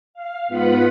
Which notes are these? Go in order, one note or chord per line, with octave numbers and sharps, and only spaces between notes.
F5
G#2 B3 F4 B4 F#5 B5